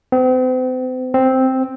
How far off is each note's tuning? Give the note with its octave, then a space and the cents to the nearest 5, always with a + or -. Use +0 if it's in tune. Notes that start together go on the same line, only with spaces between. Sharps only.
C4 -40
C4 +0